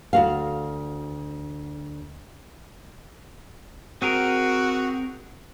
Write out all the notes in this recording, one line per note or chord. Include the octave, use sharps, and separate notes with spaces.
D2 F#4 F5
C4 F#4 G#4 A#4